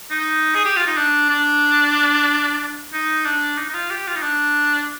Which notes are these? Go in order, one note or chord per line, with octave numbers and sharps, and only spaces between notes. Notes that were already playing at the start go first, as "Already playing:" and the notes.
D#4
G#4
G4
F4
D#4
D4
D4
D#4
D4
D#4
D#4
F4
G4
F4
D#4
D4